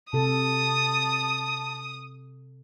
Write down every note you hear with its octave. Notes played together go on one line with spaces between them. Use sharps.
C3 A4 A5 D#6